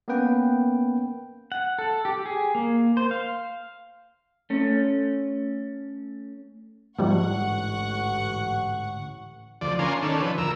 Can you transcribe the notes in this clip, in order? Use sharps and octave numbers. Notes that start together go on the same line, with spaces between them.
A#3 B3 C#4 B4 G5
F#5
A4
G4
G#4
A#3
C5
F5
A3 C#4
A1 D2 G#2 F3 G3 G#3 F#5 C#6
D2 F3 D5
C#4 D4 A#4 F5 G#5 C6
D#3 C#4 D4 A4
F3 B4
D2 A#4 E6